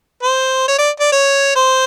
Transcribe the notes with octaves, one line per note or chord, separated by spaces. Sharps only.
C5
C#5
D5
D5
C#5
C5